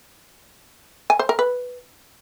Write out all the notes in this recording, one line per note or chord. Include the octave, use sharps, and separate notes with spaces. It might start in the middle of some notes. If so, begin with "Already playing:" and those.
G#5
C5
A#4
B4